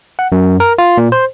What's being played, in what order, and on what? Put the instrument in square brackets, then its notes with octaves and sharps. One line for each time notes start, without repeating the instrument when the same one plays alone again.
[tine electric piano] F#5
F#2
A#4
F4
A#2
C5